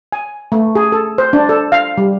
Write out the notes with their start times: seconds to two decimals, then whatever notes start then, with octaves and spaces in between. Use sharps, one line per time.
0.12 G#5
0.52 A3
0.75 G#4
0.92 A4
1.18 C5
1.33 D4
1.49 A4
1.72 F5
1.98 G3